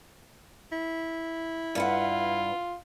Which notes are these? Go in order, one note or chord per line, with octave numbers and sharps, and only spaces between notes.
E4
G2 F4 B4 F#5